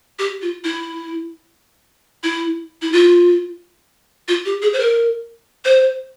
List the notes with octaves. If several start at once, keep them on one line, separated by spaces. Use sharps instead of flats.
G4
F4
E4
E4
E4
F4
F4
G4
G#4
C5
A#4
C5